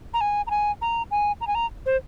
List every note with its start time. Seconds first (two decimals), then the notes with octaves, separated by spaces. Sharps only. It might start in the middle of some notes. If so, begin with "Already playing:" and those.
0.14 A#5
0.21 G#5
0.47 A#5
0.50 G#5
0.81 A#5
1.11 G#5
1.41 A#5
1.47 G#5
1.55 A#5
1.86 C5